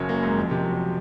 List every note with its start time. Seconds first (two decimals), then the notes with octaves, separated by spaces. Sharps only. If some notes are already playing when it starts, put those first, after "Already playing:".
Already playing: F#1 F#3 C#4
0.09 A#3
0.23 G#2
0.37 F2
0.51 C3
0.65 F#3